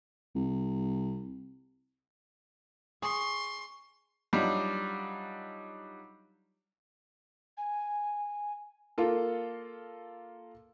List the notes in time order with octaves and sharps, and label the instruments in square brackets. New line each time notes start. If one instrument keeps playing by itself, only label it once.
[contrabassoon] C2
[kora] G#4 [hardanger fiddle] C6 [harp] C#6
[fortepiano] F#3 G3 D4 D#4 F4
[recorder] G#5
[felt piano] A#3 F4 A4